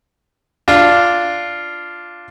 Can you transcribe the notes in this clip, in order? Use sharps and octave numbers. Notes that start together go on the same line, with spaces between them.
D4 F4